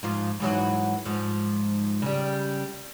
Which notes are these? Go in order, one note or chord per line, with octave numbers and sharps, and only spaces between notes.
G#2 F3 F4
G#2 E3 F#3
G#2 F3
C#3 G3